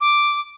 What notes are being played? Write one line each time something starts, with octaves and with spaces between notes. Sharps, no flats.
D6